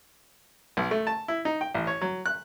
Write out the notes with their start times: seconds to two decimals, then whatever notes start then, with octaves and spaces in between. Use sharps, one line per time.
0.77 B1
0.91 A3
1.07 A5
1.28 E4
1.45 D#4
1.61 G5
1.74 A1
1.87 C#5
2.01 F#3
2.26 F#6